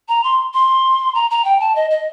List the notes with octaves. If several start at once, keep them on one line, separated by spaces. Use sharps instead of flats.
A#5
C6
C6
A#5
A#5
G5
A5
D#5
D#5